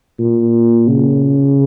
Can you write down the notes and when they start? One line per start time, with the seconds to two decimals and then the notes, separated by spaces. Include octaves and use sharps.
0.19 A#2
0.88 C#3